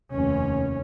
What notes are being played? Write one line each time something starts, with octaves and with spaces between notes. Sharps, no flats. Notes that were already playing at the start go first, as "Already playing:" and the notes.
F1 D#2 C#4